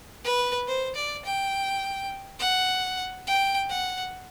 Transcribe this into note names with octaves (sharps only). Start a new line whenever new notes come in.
B4
C5
D5
G5
F#5
G5
F#5